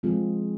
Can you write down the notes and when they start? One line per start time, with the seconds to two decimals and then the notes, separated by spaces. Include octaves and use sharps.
0.03 F3 G#3 C4 F4 G#4